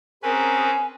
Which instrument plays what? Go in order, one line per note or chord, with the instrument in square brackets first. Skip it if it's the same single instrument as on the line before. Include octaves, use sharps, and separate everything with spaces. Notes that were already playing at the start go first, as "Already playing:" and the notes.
[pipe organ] C4 C#4 B4 [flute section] G#4 A#4 [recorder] G#5